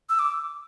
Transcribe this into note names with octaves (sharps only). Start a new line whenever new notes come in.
E6
D6